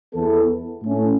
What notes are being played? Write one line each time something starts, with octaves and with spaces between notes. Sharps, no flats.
E2 E3 B3 A4
A2 A3 C#4